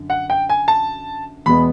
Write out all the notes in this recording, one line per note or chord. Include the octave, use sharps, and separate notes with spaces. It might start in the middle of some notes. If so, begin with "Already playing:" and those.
Already playing: F#2 D3
F#5
G5
G#5
A5
E2 B2 G#3 B3 B5